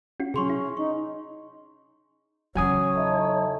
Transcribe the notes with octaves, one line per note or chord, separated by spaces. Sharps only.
C#4 F4 F#4
C3 F#3 C#4 G#4 C6 C#6
E4
D#4 C#6
E2 C#3 F#3 C#5 G#5 D#6
D#4 E4 A4